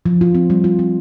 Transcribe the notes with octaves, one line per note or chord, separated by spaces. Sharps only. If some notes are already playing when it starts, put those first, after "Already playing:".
F3
F4
C4
G3
F4
C4